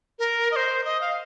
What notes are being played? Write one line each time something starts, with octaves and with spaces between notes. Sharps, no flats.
A#4
D#5
C5
D#5
F5